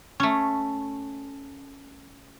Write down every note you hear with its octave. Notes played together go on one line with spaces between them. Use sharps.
A3 C#4